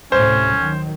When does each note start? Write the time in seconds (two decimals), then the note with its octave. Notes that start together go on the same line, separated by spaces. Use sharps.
0.12 D2 A2 C3 C#4 C5
0.53 D#3 F#3